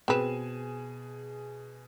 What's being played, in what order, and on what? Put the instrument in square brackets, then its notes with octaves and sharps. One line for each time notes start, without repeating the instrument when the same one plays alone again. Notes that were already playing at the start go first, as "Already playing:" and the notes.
[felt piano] B2 G#4 E7 [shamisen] C4 B4